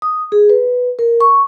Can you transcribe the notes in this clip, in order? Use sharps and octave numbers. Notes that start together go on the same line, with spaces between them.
D#6
G#4
B4
A#4
C#6